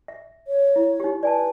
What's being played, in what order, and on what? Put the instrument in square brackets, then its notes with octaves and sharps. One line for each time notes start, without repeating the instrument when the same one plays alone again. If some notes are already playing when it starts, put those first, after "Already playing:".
[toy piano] E5
[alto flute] C#5
[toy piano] E4
D#4 G4
[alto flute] B4 [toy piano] D5 G#5 A5